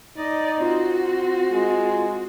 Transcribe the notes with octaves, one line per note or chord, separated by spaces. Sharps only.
D#4 D5 D#5
C4 F4 F#4
G#3